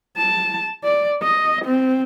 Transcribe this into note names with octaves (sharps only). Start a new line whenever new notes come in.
A5
D5
D#5
C4